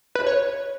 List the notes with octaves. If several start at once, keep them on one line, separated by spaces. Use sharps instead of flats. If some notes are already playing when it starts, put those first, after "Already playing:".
B4
C#5